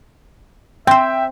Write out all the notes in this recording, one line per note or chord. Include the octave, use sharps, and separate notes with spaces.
C4 C5 E5 G5